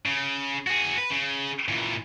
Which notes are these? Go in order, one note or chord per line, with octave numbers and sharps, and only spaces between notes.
C#3
F#4 G#4
B4
C#3
A#2 E3